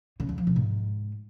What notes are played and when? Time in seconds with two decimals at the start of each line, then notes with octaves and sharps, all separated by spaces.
0.20 C#3
0.29 E2
0.38 F3
0.47 C3
0.56 G#2